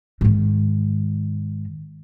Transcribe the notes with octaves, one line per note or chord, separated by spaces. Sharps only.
G#2 D#3